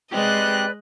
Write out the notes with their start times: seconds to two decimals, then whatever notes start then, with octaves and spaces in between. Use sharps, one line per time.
0.12 G#3 C4 G4 B4 D5 D#5 F#6